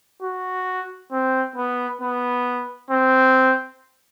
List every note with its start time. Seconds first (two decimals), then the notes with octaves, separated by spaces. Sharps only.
0.22 F#4
1.12 C4
1.56 B3
2.01 B3
2.91 C4